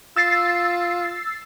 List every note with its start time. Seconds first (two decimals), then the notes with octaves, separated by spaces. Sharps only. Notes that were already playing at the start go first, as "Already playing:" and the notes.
0.16 F4 E6 A6 C7